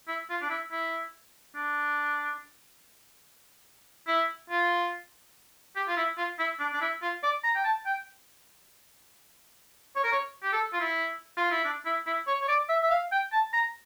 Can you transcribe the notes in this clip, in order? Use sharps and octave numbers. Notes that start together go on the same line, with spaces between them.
E4
F4
D4
E4
E4
D4
E4
F4
G4
F4
E4
F4
E4
D4
D4
E4
F4
D5
A#5
G5
A5
G5
C#5
A#4
C#5
G4
A4
F4
E4
F4
E4
D4
E4
E4
C#5
C#5
D5
E5
E5
F5
G5
A5
A#5